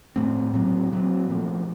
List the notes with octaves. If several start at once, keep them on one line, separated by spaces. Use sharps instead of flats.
A2 A3 C4
A#2 F#3 C4
A#2 F#3 C4
A#2 F3 A3